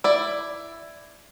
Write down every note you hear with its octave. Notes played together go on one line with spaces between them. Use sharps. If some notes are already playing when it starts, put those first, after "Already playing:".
E4 D5